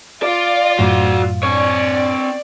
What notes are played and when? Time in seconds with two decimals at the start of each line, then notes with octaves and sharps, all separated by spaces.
0.23 F4 D5
0.79 F#2 A2 F#4 D5
1.43 C4 C#5 D5